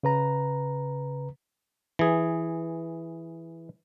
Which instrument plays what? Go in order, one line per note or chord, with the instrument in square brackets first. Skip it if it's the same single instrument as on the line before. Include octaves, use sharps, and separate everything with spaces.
[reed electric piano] C#3 B4 A#5
[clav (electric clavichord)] E3 G#4